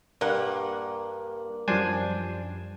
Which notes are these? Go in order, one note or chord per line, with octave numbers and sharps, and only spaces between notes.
G2 A#3 F#5
F#2 F3 G3 D4 C5 G#5